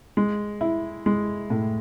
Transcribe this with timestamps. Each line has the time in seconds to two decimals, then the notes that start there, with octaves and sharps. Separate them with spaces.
0.17 G#3
0.61 E4
1.06 G#3
1.50 A2